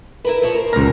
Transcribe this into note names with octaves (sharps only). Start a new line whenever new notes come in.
E4 A#4 B4
F3 E4 C#5
A#4 C5
C#2 A#2 A#4